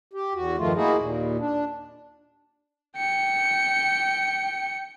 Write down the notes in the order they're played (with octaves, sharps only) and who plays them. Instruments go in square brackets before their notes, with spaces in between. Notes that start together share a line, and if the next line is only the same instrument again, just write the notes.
[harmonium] G4
E2 F#4
G2 D#3 F3 A3 F4
A#3 D#4 E4 F#4 G#4
D#2 A#2
D4
[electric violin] G5 C#7